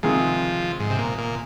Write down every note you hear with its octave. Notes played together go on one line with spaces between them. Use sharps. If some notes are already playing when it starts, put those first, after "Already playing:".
C3 D#3 F3 G#3
G#2
C3
A#2
A#2